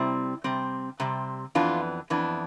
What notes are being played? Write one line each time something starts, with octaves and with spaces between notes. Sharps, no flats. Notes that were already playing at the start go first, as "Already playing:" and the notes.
Already playing: C3 G3 C4 E4
C3 G3 C4
C3 G3 C4
F2 E3 B3 D4 F4
F2 E3 B3 D4